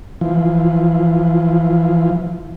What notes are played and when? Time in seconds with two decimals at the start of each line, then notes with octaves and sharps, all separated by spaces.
0.21 E3 F3